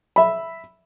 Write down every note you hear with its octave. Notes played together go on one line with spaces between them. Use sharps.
E5 B5